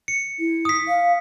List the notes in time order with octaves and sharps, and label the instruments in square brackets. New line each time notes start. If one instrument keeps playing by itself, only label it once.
[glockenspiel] C#7
[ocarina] E4
[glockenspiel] D#6 B6
[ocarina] F5